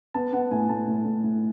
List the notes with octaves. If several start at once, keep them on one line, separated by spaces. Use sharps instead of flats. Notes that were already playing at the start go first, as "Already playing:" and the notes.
B3 A5
B3 F#5
A2 G#5
A2 A5
A2
A2
A2